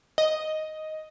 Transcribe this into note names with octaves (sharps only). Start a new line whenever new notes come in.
D#5